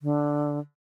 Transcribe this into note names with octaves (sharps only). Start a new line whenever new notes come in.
D3